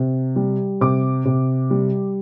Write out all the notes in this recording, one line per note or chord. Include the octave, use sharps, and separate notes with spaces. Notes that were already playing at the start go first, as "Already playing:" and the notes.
Already playing: C3
G3
C3 D6
C3
G3